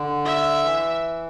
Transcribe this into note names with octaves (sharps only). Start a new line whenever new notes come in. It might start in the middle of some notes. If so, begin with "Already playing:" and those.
Already playing: D3
E5
E3